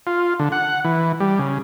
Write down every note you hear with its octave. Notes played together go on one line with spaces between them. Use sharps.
F4
D3
F#5
E3
G3
C#3